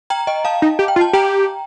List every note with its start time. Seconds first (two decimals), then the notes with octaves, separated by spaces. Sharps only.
0.10 G5 A#5
0.27 D#5 G5
0.45 F5 A5
0.62 D#4
0.79 G4
0.88 G5
0.96 F4
1.01 A5
1.13 G4 G5 A#5